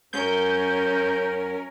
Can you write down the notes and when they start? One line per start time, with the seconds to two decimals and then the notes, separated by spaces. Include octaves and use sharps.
0.13 F#2 C#4 A#4 G6